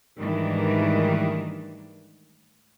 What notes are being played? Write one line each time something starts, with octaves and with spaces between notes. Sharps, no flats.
G#2 D#3 E3 G3 A3 D4